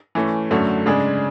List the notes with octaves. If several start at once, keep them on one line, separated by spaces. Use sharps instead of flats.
E3 A3 C#4
F#2 D3 F#3 A3
C#3 G#3 D4 G#4